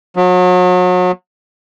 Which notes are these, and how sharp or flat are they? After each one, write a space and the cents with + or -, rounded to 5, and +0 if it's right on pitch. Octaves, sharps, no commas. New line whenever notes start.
F#3 -35